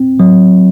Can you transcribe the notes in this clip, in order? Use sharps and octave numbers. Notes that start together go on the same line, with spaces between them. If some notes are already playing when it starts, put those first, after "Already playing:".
Already playing: C4
F#3